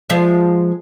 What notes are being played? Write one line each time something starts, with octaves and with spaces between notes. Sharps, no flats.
F3 G#3 E5